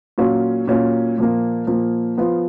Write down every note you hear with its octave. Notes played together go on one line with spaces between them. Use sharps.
A#2 F#3 C#4 F4
A#2 F#3 C#4 F4
A#2 F3 A#3
A#2 F3 A#3
F3 B3 F4